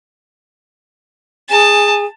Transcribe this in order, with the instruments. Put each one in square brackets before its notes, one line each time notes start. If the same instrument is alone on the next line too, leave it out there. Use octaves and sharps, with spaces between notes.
[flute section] G#4 G#5 [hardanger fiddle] A5